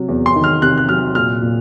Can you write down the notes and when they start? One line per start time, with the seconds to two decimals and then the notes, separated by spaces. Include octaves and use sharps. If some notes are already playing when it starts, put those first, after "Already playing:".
Already playing: C3 F#3
0.08 E2
0.26 C6
0.36 D#3
0.44 F6
0.62 C3 F#6
0.78 F#6
0.88 F#3 F6
1.15 A#2 F6
1.42 A#2